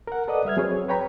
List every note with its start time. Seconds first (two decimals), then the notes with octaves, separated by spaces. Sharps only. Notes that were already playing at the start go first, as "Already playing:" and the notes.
0.07 A#4 F#5
0.28 A4 B4 D5 D#5 F#5 D#6
0.45 G3 E5 F6 G#6
0.57 F#3 C4 G#4 B4 C#5
0.88 B4 C#5 G5 A#5 B5